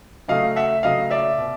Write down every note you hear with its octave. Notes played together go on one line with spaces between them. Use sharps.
C#3 F#3 A3 D#5 F5
E5 F#5
C#3 F#3 A3 D#5 F5
D5 E5
B2